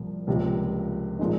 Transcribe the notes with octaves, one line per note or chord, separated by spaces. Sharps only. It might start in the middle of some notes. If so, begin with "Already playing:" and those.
Already playing: C2 A#2 F3
C#2 C3 F3 A#3
A#2 F3 G#3 D#4